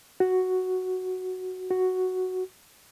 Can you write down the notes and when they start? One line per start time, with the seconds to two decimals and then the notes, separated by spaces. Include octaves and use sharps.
0.20 F#4
1.71 F#4